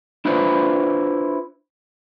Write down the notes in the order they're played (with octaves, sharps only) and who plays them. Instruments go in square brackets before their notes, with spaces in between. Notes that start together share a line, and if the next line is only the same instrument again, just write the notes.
[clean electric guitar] D4 E4 F4 B4 C5 D5